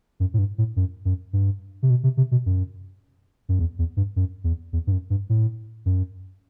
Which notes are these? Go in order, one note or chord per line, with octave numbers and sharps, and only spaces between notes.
F#2
A2
G2
A2
F#2
F#2
G2
C3
B2
C3
C3
B2
F#2
F#2
E2
E2
G2
F#2
E2
E2
G2
F#2
G2
A2
F#2